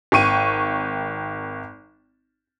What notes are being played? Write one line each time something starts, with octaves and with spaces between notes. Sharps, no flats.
G#1 G5 C#6 D#7